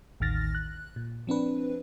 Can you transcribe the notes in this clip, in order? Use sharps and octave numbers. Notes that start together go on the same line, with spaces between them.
A1 D#2 D#3 F6 A6 A#6
F#6
A#2
F3 C4 D4 B4